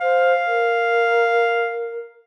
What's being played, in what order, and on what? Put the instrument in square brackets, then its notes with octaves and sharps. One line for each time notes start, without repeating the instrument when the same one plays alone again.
[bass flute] C5 [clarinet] F5
[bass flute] A#4